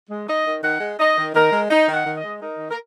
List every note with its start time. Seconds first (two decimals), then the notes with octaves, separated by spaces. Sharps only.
0.09 G#3
0.28 D#4 D#5
0.46 D#3
0.63 D#3 F#5
0.80 G#3
0.99 D#4 D#5
1.17 D#3
1.34 D#3 A#4
1.52 G#3
1.70 D#4
1.88 D#3
1.94 F#5
2.05 D#3
2.17 D#5
2.24 G#3
2.41 D#4 A#4
2.59 D#3
2.71 A#4